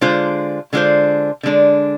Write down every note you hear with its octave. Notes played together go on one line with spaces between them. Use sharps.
D3 G#3 D4 F4 C5
D3 G#3 D4 F4 C5
D3 G#3 D4